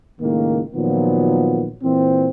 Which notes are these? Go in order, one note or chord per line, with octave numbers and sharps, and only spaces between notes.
C#2 A2 D#3 A#3
A#2 D#3 F3 F#3 B3
A#2 E3 C4